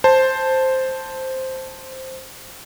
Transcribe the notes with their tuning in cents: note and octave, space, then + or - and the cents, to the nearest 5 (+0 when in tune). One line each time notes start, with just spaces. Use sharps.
C5 +0 A5 +0